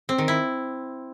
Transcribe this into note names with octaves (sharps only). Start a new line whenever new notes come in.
C4
D#3
E4